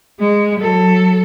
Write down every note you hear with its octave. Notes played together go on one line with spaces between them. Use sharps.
G#3
F#3 A4